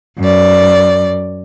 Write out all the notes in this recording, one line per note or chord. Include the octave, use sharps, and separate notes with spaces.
F#2 D5